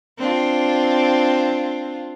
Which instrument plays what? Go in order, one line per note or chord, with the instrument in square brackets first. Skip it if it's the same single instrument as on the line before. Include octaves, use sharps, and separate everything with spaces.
[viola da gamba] C4 D4 F4